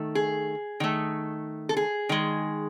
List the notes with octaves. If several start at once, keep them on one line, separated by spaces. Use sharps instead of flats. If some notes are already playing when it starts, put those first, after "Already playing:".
Already playing: D#3 A3
G#4
D#3 A3
A4
G#4
D#3 G#3